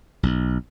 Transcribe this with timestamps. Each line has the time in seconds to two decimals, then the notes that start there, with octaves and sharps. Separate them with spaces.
0.23 B1